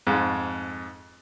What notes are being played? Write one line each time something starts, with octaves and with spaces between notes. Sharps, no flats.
F2 G#2